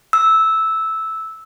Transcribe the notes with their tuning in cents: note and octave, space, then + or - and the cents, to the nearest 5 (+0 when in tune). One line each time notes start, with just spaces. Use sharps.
E6 -10